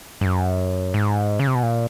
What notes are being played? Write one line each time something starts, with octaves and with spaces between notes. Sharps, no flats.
G2
F#2
G#2
C#3
C3
B2
A#2